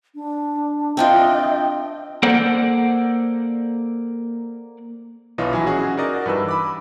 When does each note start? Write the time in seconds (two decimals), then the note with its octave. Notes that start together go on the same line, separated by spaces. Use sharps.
0.15 D4
0.97 C4 D4 F4 D#5 E5 G5
2.23 A#3 A4 C5 D5 F#5
5.38 B1 E3 D4 F4 C#5 D#5
5.52 A#1 F#3 E4 G#5
5.66 C#4 F#4 G#4
5.97 D#4 F#4 A#4 D5 D#5
6.26 G2 E3 B4 E6
6.49 B5 D6